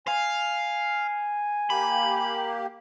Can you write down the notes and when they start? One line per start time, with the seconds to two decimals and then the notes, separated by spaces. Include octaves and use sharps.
0.08 F5 G#5
1.70 A#3 G4 B5